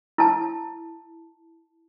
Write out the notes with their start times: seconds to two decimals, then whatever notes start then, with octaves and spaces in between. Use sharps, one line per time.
0.18 E4 A5